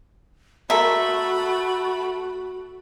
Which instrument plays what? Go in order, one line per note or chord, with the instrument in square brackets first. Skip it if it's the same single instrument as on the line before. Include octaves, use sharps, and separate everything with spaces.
[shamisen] G#3 A4 A#4 [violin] A3 B5 [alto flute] F#4 [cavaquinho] E5